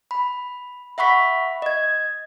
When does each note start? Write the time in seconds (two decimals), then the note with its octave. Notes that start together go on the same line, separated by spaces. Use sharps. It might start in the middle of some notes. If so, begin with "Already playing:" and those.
0.11 B5
0.98 E5 F#5 B5 C#6 B6
1.62 D#5 G#6